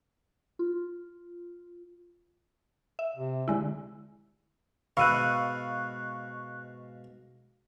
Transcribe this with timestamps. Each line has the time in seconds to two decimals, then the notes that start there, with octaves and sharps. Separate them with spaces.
0.59 F4
2.99 E5
3.16 C3
3.48 D3 G#3 E4
4.97 G#2 B2 F5 B5 C#6 E6 F#6 D#7